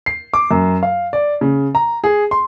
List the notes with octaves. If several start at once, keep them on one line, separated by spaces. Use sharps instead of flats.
C7
D6
F#2
F5
D5
C#3
A#5
G#4
C6